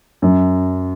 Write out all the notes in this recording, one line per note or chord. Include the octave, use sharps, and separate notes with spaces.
F#2